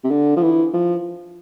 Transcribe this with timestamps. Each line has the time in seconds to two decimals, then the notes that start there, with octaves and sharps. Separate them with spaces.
0.04 C3
0.11 D3
0.37 F3
0.42 E3
0.73 F3